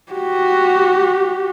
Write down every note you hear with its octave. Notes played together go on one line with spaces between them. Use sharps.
F#4 G4